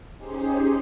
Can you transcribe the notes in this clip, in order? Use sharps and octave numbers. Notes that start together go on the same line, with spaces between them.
C#4 D#4 G4 G#4 C5